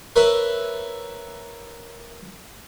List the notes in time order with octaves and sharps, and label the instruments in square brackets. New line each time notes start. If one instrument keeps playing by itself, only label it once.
[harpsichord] A#4 B4 C#5 E5